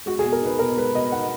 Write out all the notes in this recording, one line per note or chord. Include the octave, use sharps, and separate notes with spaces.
G#3 F#4
G#4
B2
A#4
D#4 B4
B2 A#4
G#3 B4
B2 D#5
D#4 F#5